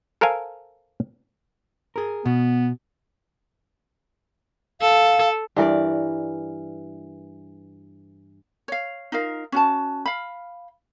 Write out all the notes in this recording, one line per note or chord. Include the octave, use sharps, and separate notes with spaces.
A4 A#4 C5 F5 G#5
G#4 A#4
B2 B3
A4 F5
G2 E3 A#4 D5
C#5 F5
D#4 F4 A#4 F5
C#4 F#4 A5
F5 B5